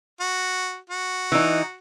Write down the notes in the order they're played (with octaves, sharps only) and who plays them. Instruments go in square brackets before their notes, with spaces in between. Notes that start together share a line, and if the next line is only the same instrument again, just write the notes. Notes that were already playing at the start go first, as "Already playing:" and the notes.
[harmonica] F#4
F#4
[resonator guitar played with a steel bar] E3 D#4